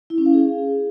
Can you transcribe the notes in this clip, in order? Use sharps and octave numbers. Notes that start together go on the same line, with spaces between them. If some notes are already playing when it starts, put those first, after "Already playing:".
E4
C#4
F5
G#4